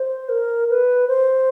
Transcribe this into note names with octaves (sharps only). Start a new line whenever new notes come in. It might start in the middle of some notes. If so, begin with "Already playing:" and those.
Already playing: C5
A#4
B4
C5